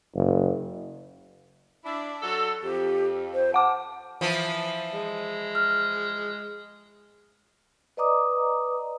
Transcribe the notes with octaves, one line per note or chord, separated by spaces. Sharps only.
F#1
D4 E4
F#3 A4
F2 G4
C5
F#5 A5 D6
E3 F3
G#3
F6
B4 D5 D#5 A#5 D6 D#6